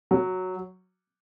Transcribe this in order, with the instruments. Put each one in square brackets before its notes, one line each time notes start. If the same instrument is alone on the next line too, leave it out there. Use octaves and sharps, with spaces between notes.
[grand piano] F#3